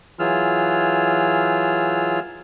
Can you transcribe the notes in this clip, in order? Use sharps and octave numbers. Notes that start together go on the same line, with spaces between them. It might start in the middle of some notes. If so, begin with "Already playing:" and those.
E3 F#3 F4 G#4 E6 F6